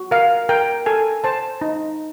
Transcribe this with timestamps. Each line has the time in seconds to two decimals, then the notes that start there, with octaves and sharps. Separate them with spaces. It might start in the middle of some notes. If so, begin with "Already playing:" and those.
Already playing: F#4
0.11 A#4 F5
0.49 A#4 G5
0.86 A4 G#5
1.24 C5 A5
1.61 D#4